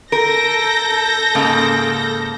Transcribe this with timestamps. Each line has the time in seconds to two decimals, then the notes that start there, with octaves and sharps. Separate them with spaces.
0.12 A4 A#4 G6 A#6
1.35 G#2 C#3 A#3